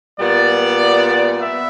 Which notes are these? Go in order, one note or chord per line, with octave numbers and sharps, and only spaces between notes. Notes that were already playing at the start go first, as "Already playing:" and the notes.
A#2 G3 B3 D5
B3 E5